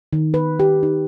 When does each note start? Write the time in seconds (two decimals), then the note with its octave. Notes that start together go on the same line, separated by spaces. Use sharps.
0.13 D#3
0.34 B4
0.60 G4
0.83 D#4